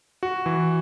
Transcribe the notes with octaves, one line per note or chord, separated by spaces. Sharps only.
F#4
E3